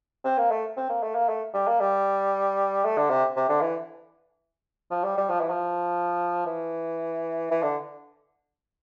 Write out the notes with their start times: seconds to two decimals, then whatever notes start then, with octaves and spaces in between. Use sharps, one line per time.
0.25 C4
0.38 A#3
0.51 A3
0.77 C4
0.89 A#3
1.03 A3
1.15 A#3
1.29 A3
1.54 G3
1.68 A#3
1.80 G3
2.84 A3
2.98 D3
3.10 C3
3.36 C3
3.49 D3
3.61 E3
4.91 F3
5.04 G3
5.18 G3
5.30 F3
5.40 E3
5.50 F3
6.46 E3
7.51 E3
7.63 D3